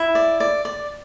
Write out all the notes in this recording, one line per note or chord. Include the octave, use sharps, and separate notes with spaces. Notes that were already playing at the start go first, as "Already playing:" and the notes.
Already playing: E4 E5
D5
D5
D5